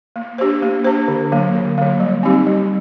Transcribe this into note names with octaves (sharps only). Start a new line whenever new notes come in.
A#3
D4 G4 C5
A#3
D4 G4 C5
D3
F#3 A#3
D3
F#3 A#3
G3
C4 D#4 G4
G3